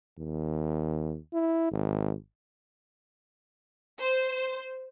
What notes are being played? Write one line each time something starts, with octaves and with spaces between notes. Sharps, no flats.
D#2
E4
G#1
C5